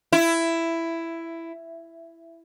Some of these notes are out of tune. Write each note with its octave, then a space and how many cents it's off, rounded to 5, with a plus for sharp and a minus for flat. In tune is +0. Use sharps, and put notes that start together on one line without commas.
E4 +10